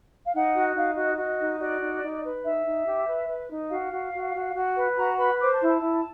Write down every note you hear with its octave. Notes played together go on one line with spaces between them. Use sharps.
F5
D#4 F#5
F#4
D#4 F5
F#4 D#5
F#4 D#5
D#4
F#4 D5
D#4
D#4
B4
D#4 E5
D#4
G4
B4
B4
D#4
F#4 F5
F#4
F#4
F#4
F#4
B4
F#4 A#5
B4 B5
C5 D6
A5
E4
A5
E4